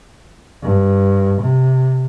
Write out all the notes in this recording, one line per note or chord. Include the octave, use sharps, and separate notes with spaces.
G2
C3